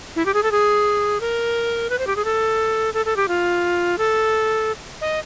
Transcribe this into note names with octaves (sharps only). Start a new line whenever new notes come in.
E4
G4
G#4
A4
G#4
A#4
B4
C5
G4
G#4
A4
A4
A4
G4
F4
A4
D#5